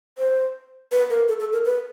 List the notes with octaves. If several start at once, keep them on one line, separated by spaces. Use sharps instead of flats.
C5
B4
A#4
A4
A4
A#4
B4